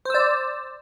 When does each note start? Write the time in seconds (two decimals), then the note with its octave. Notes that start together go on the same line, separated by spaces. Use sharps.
0.05 C5
0.10 E6
0.14 D5